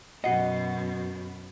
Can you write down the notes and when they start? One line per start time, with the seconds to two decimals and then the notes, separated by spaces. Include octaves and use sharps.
0.24 F#2 B2 F#4 D#5 F#5 C7